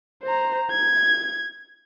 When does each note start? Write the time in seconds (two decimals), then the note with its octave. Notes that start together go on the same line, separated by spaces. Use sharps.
0.23 C5 A#5
0.71 G#6